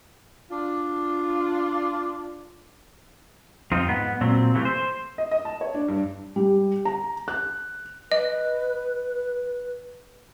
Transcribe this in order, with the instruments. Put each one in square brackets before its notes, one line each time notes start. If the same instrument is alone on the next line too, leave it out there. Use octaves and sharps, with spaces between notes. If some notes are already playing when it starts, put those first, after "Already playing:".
[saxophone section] D4 F4
[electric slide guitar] F2 C4 D#4 F4
G#2 B3
A#2 F#3 C4
C3 E3 A3
C5
[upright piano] D#5
D#5
A5
C#5
D4
G2
[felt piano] G3
A#5
F#6
[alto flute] B4 [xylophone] D#5